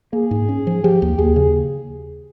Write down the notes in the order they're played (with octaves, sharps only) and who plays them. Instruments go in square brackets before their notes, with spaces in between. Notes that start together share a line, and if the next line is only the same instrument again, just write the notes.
[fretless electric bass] A#3 [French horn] G#4
[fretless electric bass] G#2
C#4
F3
[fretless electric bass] F3 [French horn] G4
[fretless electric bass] D#2
[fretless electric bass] D#2 [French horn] G#4
[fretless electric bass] C#3